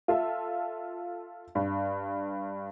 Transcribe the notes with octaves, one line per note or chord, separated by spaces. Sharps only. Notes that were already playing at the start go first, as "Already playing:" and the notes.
F4 A4 E5
G2